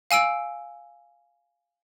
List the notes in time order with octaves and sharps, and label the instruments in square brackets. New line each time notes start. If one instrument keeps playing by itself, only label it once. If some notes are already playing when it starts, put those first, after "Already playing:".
[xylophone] F5 G#5 E6 D7